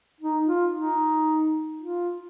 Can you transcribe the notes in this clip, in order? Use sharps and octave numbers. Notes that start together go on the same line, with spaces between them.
D#4
F4
D#4
F4